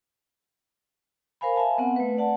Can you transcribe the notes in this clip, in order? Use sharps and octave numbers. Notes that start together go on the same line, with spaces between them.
A#4 C5 F5 G#5 B5
E5 F5 G#5 A5
B3 C4 F#5
A3 B4
D5 F#5 A5